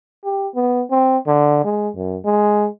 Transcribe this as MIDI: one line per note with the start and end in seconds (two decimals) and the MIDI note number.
0.24 0.48 67
0.55 0.83 59
0.91 1.18 60
1.27 1.64 50
1.64 1.89 56
1.96 2.17 42
2.25 2.68 56